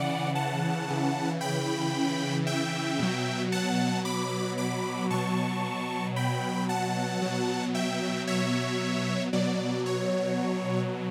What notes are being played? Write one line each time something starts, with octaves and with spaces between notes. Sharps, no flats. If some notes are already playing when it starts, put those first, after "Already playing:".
Already playing: C#3 E3 D5 F#5
F#5 A5
C#3 E3
G5 B5
E5 G5
B2 F#3
F#5 A5
B5 D6
B5 D6
B2 F#3 A5 C#6
G5 B5
F#5 A5
B2 F#3
E5 G5
C#5 E5
B2 F#3 D5
C#5